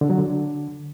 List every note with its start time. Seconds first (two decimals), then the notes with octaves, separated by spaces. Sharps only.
0.01 D3
0.10 F#3
0.18 D3